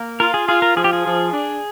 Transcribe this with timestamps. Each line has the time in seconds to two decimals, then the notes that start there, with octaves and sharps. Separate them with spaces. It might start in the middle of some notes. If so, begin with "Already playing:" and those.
Already playing: A#3
0.20 F4 A#4
0.34 G#4
0.48 F4 G#4
0.62 A#4
0.76 F3 G#4
0.84 G4
0.93 G#4
1.05 F3
1.32 D4